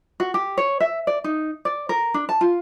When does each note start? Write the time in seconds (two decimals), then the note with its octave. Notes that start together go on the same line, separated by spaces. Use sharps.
0.20 F#4
0.34 G4
0.57 C#5
0.80 E5
1.07 D5
1.24 D#4
1.65 D5
1.89 A#4
2.14 D4
2.29 A5
2.41 F4